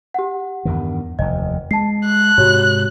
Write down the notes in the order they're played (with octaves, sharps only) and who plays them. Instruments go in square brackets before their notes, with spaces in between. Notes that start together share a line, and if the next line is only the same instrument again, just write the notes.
[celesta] G4 F#5
[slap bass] E2 G2 D#3
[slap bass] F1 D#2 [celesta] D#5
[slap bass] G#3 [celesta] A5 C7
[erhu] F#6
[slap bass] G#2 C3 [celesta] F#4 G4 C#5